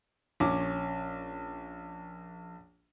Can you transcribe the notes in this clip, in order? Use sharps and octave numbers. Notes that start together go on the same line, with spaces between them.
A#1 C#4 D6